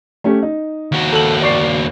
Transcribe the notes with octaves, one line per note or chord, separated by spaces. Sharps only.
A3 C#4 G4
D#4
D#2 F#4
A4 F#7
D5 C#6 C7